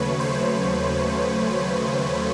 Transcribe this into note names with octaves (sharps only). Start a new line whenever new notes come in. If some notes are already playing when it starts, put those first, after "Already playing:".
Already playing: D#2 C#3 F#3 A3 B4 C#5
C5